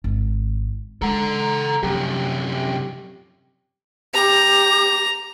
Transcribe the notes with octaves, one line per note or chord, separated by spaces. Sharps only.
G#1
G#3 A4 F#5 A#5
F#2 C3 F3 G4
G4 A#5